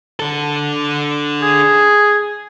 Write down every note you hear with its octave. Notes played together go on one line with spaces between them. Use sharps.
D4 A4
G#4